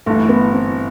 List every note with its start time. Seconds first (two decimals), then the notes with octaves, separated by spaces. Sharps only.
0.06 G1 G2 E3 A3
0.29 B3
0.53 C4